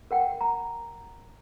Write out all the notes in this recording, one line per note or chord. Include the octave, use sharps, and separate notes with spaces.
A#4 F#5 G5
A#5